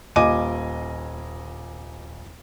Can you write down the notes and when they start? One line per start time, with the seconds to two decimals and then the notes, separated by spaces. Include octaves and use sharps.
0.16 D#1 F4 D#5 G#5 D6 D#7